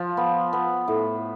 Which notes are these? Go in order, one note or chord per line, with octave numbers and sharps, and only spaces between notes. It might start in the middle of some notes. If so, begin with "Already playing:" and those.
Already playing: F3
B3
B3
A2